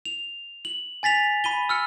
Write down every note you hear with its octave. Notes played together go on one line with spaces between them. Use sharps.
F7
F#7
G#5 A6 B6 F7
B5 D#7 G7
E6 F6 C#7